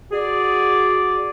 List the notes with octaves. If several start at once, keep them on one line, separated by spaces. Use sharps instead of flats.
F#4 G#4 D5